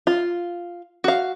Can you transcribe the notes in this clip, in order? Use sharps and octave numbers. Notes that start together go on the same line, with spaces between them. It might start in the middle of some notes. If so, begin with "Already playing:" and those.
F4
F#4 F5